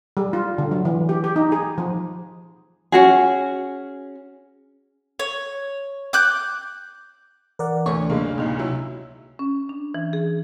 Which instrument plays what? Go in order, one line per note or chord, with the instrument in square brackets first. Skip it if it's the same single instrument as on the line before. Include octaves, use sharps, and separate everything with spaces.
[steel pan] G3
F4
D3
F#3
E3
G4
G4
D#4
G#4
F3
[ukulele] C#4 F#4 G#4
[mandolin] C#5
D6 F#6 G6
[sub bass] E3 [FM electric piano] A#4 D5 F#5
[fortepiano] D2 C#5 C#6 [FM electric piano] D4
[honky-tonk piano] F#1 G#3 A#3 [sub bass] C3
[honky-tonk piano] C#2 A#2 D#3
F#3 E4
[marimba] C#4
D4
E3
G#4